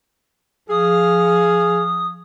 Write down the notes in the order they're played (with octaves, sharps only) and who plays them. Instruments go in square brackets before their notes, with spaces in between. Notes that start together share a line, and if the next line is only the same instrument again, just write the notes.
[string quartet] F3 F5 [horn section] G#4 [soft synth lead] D#6